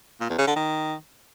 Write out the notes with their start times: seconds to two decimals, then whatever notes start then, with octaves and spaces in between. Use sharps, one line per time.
0.21 A#2
0.30 E2
0.38 C#3
0.47 D3
0.56 D#3